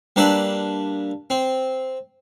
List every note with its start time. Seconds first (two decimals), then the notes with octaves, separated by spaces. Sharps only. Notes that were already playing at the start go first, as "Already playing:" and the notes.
0.16 G3 A#3 D4 B4 E5
1.30 C4